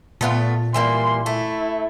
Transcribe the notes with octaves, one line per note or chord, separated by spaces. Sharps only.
A#2 A3 B3 F4
E3 G3 A#3 C6
A3 E4